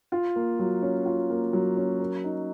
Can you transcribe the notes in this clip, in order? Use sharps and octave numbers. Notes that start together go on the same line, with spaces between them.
F4
A#3
F#3
C#4
F4
A#3
F#3
C#4
A#4
D#4